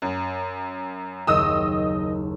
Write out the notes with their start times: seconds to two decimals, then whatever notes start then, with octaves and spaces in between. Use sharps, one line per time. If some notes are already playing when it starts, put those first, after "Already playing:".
0.02 F#2
1.27 F#1 D#2 D#5 D#6 E6